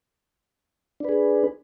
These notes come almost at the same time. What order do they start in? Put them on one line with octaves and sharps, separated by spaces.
D4 B4 G#4